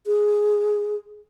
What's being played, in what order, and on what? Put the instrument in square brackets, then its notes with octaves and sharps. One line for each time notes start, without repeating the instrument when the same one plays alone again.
[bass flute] G#4